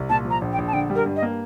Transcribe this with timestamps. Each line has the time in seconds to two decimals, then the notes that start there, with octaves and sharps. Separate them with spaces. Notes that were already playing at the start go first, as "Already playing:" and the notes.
Already playing: C2
0.09 A#2 A5
0.25 F3
0.30 A#5
0.41 A#1
0.52 G5
0.58 A#1
0.67 A5
0.73 D3 G5
0.90 G3
0.95 A#4
1.06 G2
1.16 D#5
1.22 A#3